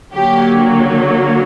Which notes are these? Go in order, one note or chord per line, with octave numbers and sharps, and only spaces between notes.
D3 F#3 A#3 G4